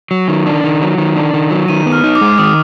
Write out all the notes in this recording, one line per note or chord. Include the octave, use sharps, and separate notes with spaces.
F#3
D#3
D4
D#3
F#3
D#3
D4
D#3
F#3
D#3 D#7
B3
F6
D#4
D6
G#3
D#3 D#6